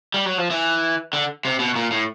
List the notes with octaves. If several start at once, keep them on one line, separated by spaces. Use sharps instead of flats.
G3
F#3
F3
E3
D3
C3
B2
A#2
A2